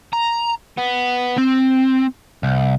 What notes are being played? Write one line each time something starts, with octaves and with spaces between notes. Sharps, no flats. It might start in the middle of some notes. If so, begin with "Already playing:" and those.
A#5
B3
C4
C2